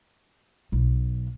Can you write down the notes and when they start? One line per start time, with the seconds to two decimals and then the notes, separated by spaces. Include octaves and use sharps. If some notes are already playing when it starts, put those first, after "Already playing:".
0.72 B1